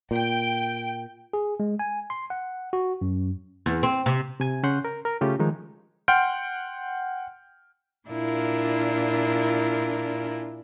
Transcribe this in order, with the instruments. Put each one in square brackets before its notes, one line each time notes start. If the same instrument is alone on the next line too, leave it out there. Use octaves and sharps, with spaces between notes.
[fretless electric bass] A#2 [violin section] G5
[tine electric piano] G#4
G#3
G#5
C6
F#5
F#4
F#2
[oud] E2
C4
C3
[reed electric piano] C3 G#5 G#6
C#3 C#4 F#5 C6 F#6 G6
A#4
A#4
C#3 A3 C#4 F4 G4
D#3 F3 G#3 D#4
[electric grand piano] F#5 G5 C6 F6 G6 D7
[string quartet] A#2 D4 E4 F4 A#4